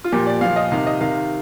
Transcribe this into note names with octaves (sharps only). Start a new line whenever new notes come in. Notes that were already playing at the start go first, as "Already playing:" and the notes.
F4
A#2 F3 G4
D5
A#2 F3 F5
D#5
C3 D#3 F5
D#5
C3 D#3 F5